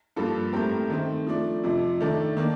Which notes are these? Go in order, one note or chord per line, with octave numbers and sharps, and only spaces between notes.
G2 F3 A#3 F4 A4
A2 A3 C4 G4 A#4
D#3 A3 C4
F3 A3 D4
F2 C3 F3
D#3 A3 D4 A4
D#3 A#3 D4